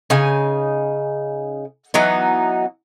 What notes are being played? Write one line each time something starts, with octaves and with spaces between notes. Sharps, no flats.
C#3 D#4 G#5
E3 F#3 B3 D#4